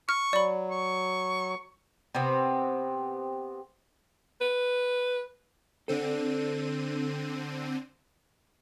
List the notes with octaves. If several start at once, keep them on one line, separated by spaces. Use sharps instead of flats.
C#6 F6
F#3 D5 B5
C#6
C3 B3 C4
B4
D3 C4 A4 D5 D#7